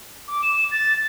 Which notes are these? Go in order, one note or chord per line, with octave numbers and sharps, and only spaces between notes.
D6
E7
A6